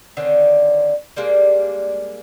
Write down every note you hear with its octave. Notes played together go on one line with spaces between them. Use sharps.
D3 D#3 C4 C#4
G3 G#3 A#3 D4